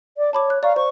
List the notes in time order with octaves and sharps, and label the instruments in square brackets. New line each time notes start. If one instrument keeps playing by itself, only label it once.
[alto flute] D5
[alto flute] C#5 [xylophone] A5 B5 D6
[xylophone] F#6
[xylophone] D5 A#5 C#6 [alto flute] F5
[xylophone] C5 [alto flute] C#6